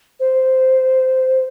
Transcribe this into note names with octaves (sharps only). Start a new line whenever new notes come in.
C5